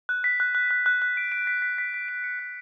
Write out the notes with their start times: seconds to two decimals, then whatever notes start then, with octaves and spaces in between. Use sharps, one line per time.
0.09 F#6
0.24 B6
0.40 F#6
0.55 F#6
0.71 F#6
0.86 F#6
1.02 F#6
1.17 D7
1.32 D7
1.47 B6
1.62 B6
1.78 B6
1.94 B6
2.08 D7
2.24 C#7
2.39 F#6